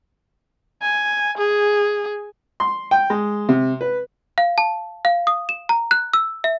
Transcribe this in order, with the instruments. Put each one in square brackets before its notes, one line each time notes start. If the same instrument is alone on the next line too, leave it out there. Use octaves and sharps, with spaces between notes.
[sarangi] G#5
G#4
[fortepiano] C6
G5
G#3
C3
B4
[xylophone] F5
A5
F5
D#6
E7
A#5
F#6
E6
E5